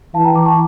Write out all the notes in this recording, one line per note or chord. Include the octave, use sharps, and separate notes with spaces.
E3 F5 A5
G5 A#5
A#5 D6
A5 C#6